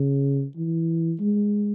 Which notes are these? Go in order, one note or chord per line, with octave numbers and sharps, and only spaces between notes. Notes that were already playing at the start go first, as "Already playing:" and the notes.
Already playing: C#3
E3
G#3